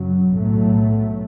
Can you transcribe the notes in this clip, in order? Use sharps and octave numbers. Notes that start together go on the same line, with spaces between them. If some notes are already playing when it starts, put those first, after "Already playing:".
Already playing: F#2 C#3 F#3
B1 A2 F#3 A3